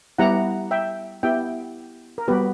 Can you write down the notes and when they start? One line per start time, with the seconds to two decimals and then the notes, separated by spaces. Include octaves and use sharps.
0.18 G3 B3 E4 G4 F#5 A#5
0.71 E5 G5
1.23 B3 E4 G4 E5 G5
2.18 A#4
2.28 G3 B3 F#4 G4 B4